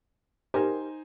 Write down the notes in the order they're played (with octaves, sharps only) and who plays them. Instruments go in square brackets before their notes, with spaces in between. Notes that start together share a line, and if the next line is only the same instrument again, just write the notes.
[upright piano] D#4 C5 G#5 [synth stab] G4 A#4